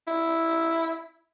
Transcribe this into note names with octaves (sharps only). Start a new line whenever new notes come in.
E4